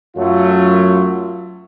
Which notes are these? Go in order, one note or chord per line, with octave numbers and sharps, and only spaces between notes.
F#2 F#3 A3 F4